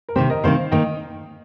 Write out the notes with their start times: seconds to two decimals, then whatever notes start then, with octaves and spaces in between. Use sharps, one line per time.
0.09 A#4
0.16 C3 D#3 C4 G4 C5
0.30 A#4 D#5
0.44 C3 D#3 C4 C5 F5
0.72 D#3 A#3 D#5 G5